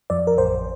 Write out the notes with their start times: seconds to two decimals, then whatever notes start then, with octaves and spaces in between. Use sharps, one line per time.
0.10 F2 D5
0.27 A#4
0.38 A1 C5